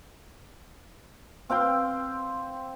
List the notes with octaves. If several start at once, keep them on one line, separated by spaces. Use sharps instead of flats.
C4 F5 G5 C6